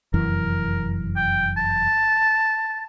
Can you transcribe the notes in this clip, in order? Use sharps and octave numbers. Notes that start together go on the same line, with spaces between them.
F1 F#2 E3 A#4
G5
A5